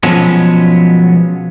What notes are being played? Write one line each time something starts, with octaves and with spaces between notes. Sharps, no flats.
B2 F3 F#3 G#3 B3 C#4